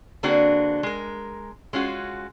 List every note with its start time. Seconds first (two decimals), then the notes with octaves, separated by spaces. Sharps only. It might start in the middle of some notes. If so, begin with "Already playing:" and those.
0.23 D3 A#3 C4 D4 F#4 G#4
0.83 G#3 A#4
1.73 G#3 C#4 F4 F#4